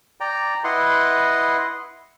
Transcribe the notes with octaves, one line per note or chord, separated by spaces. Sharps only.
D5 G5 A#5
E4 B4 D#5 F#5 C6